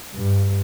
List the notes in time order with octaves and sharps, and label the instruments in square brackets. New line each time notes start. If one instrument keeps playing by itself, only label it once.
[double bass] G2